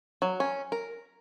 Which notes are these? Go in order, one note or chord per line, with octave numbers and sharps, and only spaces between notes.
F#3
C#4
A#4